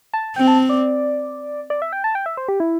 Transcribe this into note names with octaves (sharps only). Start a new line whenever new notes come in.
A5
C4 G5
A5
D5
D5
E5
G5
A5
G5
E5
C5
G4
E4